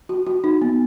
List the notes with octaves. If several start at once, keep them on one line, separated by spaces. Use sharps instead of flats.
F#4
F#4
D#4
B3